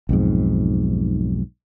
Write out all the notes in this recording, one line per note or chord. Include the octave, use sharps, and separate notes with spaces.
B1 F2 G#2